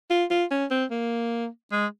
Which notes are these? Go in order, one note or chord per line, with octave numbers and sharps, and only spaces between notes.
F4
F4
C#4
C4
A#3
G#3